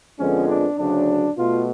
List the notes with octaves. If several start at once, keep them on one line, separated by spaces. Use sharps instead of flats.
F2 D3 F3 G#3 B3 C#4
D4
D2 C#3 F#3 D4
B2 A3 F4